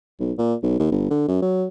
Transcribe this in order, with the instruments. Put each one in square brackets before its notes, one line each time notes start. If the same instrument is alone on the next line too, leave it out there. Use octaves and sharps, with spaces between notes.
[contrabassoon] B1
A#2
B1
D#2
G1
D3
F#2
F#3